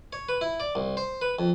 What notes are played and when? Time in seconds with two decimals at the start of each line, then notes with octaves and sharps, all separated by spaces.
0.13 C#5
0.29 B4
0.41 E4
0.60 D5
0.75 C2
0.97 C5
1.22 B4
1.39 F2